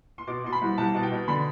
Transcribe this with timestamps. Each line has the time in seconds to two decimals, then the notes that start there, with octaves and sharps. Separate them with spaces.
0.18 C6
0.27 B2 D6
0.44 B2 C6
0.52 B5
0.61 C2
0.78 C2 A5
0.94 B2 A5
1.03 G5
1.12 B2
1.28 D3 B5